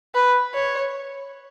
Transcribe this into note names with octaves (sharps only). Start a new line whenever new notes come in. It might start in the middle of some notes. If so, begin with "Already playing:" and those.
B4
C#5